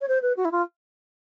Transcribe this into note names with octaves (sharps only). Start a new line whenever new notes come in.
C#5
C5
B4
F#4
E4
F4